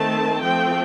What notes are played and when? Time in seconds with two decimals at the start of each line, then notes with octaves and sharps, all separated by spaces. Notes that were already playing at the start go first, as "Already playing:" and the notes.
Already playing: D#3 A3 C4 A5
0.42 F3 A3 C4 G5